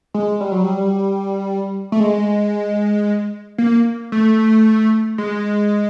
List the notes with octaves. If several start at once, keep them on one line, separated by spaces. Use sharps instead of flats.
G#3
G3
F#3
G3
A3
G#3
A#3
A3
G#3